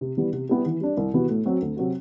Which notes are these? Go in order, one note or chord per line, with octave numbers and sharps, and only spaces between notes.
C3
E3 G3 B3
C3
G3 B3 E4 G4
E3
G3 D4
C2
C3 E3 B3 F#4
A2
F#3 C4 F#4
D2
C3 F#3 C4 F#4